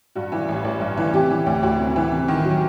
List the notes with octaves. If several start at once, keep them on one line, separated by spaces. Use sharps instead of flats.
G2 F#4
E3
A1
A1
G2
E3
C3 G4
E3
D2
D2 F#4
C3
E3
C3
D#3
F#3